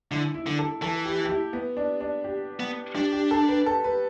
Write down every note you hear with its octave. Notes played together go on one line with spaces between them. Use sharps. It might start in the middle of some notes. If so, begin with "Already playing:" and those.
D3 E4
E4
D3
A4
E3 A4
G4
G4
E4
B3
D4
D4
G4
B3
D4 G4
G4
A4
B4
A4
B4